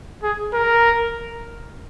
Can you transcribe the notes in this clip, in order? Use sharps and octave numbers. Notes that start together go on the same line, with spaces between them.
G#4
A#4